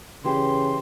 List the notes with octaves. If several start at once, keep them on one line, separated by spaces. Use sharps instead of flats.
C#3 E3 G4 C6